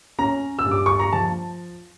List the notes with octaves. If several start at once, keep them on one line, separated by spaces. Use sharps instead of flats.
C#4 A#5
E6
G2
D6
C#6
A#5
F3 A5